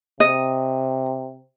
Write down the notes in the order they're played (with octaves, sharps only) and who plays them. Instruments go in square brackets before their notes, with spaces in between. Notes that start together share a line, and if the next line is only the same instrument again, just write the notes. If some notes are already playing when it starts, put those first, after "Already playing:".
[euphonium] C3 [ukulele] D#5